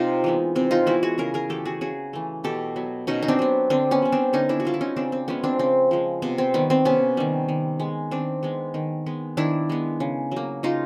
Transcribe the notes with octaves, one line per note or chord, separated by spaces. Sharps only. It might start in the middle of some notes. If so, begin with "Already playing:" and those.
Already playing: C3 D#4 F4 G4
E3 G#3 B3
C3 C4
D#4 F4
E3 G#3 B3 E4 F#4
F#4 G#4
C#3 G#4 A#4
G#4 A#4
E3 A3 G4 A4
F#4 G#4
C#3 F#4 G#4
E3 A3
B2 G4 A4
F#3 B3
B2 C#4 D#4
D#4
C4 D4
F#3 B3
D3 C4 D4
B3 C#4
G3 B3
C4 D4
D3 C#4 D#4
D4 E4
F#4
G3 B3 F4
E4
C#4 D#4
C#3 C4 D4
C4
F3 G#3 B3 C#4
C4 D4
C#3 C4
F3 G#3
C3 B3
C4
D#3 G3 B3
C4
C3 B3 C#4
D#3 G3
D#3
G#3 B3
D#3 C4 D4
G#3 B3
D#3
G#3 B3
D#3 D4 E4
G#3 B3
C#3
F#3 A#3
C#3 D#4 F4